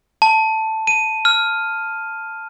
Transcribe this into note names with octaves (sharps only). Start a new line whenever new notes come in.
A5
D#7
F6